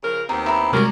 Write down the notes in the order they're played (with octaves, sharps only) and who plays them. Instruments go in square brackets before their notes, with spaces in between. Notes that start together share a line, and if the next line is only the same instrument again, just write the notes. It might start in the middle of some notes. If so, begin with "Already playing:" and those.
[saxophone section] C#3 F3 A#4
[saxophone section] D#2 B3 C4 [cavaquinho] D#4
[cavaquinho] E4 A#4
[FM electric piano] C3 G3 G#3 [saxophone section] C#4 F#4 A#4 [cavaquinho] D5 A#5